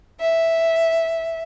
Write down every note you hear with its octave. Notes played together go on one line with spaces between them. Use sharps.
E5